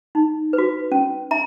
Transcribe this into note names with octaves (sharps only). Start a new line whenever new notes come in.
D#4
B4
F#4
C#4
E5 A#5